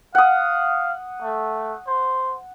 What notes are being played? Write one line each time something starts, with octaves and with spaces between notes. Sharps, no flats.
F5 F#5 D#6
A3
C5